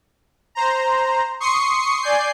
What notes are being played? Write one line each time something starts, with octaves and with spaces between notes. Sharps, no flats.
C5 A#5
C6 C#6 D#6 C7 C#7
D5 G#5 G6 C7